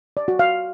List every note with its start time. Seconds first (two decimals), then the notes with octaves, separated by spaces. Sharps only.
0.17 D5
0.28 F#4
0.39 F5